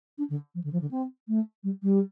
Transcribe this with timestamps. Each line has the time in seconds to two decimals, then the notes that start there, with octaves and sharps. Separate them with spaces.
0.18 D4
0.30 D3
0.55 F3
0.64 D3
0.73 F3
0.81 D3
0.91 C4
1.28 A3
1.64 G3
1.83 G3